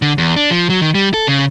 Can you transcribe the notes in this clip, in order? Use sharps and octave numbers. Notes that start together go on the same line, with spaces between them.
D3
E2
D4
F3
F#3
D#3
G3
A4
C#3